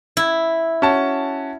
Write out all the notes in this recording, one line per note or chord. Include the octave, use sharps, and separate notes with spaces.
E4
C#4 F#4 A5